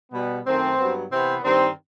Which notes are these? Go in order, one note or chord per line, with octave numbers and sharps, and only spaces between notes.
B2 G3 B3
F#2 D#3 A3 C4
G2 F#3 B3
C3 E3 B3 C4
G2 D#3 G3 C4